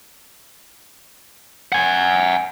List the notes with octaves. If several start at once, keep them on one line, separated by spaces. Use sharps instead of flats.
F#5 G#5